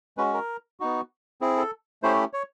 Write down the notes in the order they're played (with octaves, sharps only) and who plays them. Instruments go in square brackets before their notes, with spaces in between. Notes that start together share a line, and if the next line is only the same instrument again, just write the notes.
[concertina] G#3 C#4 F#4 B4
A#4
B3 D#4 F#4
C4 E4 G#4
A4
A3 C#4 E4 G4 C5
C#5